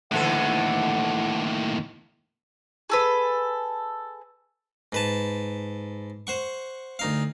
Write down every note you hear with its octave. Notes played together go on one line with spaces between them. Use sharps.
D#2 A2 D3 E3 A4 F#5
G#4 A4 B4
G#2 B4 A5
C5 F#5 C#6
D2 D#4 F5